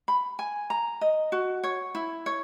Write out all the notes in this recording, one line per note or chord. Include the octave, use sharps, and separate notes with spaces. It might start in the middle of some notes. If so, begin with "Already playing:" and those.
B5
G#5
A#5
D#5
F#4
C#5
E4
C#5